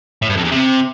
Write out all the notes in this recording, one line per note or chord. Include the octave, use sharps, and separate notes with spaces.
A2
G2
F2
E2
C3